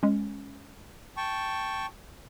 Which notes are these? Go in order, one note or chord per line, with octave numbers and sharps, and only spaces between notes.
G#3 C#4
G5 A5 C#6